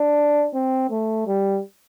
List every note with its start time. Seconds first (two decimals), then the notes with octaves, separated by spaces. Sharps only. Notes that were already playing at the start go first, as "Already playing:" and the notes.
Already playing: D4
0.54 C4
0.90 A3
1.27 G3